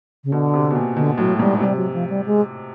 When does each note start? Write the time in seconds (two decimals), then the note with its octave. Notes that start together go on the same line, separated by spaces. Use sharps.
0.24 C#3
0.32 B2 D3
0.54 C3
0.70 B2
0.75 A#2
0.96 B2 D3
1.18 A2 F#3
1.39 G#2 G3
1.61 C3 G3
1.77 F#3
1.93 F3
2.09 G3
2.26 G#3